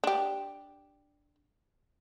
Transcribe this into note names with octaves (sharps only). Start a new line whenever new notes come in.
D4 G4